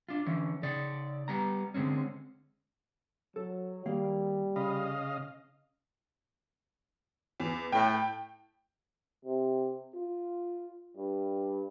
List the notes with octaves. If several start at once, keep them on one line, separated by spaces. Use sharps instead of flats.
D4 F4
D3 E3 C#4
C#3 D#4 D5
G3 B3 A#5
D3 G#3 C4 C#4
F#3 A4
D#3 G3 A#3 F5
C#3 D#5 F5 B5
E2
A2 G5
C3
F4
G2